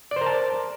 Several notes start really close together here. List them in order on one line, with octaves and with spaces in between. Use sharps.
D5 C5 A#4 A5